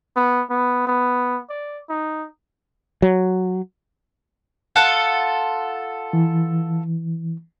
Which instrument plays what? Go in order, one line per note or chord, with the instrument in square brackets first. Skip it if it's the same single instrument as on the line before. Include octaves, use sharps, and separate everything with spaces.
[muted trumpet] B3
B3
B3
D5
D#4
[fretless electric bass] F#3
[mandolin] F4 A4 F#5
[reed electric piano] E3